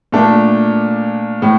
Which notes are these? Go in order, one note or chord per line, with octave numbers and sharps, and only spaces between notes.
A#2 A3 D4
A2